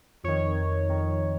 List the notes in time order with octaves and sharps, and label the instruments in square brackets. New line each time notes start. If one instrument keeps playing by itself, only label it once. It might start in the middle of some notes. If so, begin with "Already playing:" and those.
[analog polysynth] F2 D#3 C#5
F2 D#3